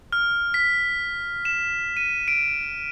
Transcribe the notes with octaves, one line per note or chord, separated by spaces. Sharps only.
F6
B6
E7
D#7
D7